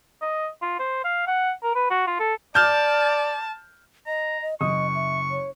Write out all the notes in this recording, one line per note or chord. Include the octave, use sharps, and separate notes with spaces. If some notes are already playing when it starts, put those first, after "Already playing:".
D#5
F4
C5
F5
F#5
A#4
B4
F#4
F4
A4
D5 A5 F6 G6
D#5 A#5
D#5
F#1 D#5 C#6 D#6
E5
C#5